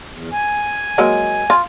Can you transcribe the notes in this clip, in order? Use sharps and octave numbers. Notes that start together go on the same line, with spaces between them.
E2
G#5
F#3 G#3 A#3
F4